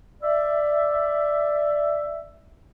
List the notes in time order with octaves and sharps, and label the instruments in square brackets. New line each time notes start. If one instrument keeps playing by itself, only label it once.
[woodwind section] D5 E5